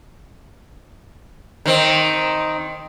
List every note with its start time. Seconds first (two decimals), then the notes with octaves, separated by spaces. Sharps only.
1.66 D#3 C4